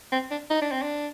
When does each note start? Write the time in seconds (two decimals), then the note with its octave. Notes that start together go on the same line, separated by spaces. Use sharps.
0.12 C4
0.31 D4
0.50 D#4
0.61 D4
0.71 C4
0.82 D4